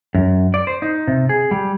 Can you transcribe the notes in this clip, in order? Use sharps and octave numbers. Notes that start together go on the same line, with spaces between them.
F#2
D5
C5
D#4
C3
G#4
G3